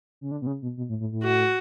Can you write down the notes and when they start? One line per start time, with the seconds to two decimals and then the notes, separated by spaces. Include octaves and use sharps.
0.21 C#3
0.31 D3
0.42 B2
0.47 C#3
0.62 B2
0.77 B2
0.89 A2
1.00 A2
1.12 A2
1.23 F#4